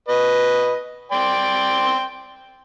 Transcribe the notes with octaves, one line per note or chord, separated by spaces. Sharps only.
B4 D#5
D5 G5 C6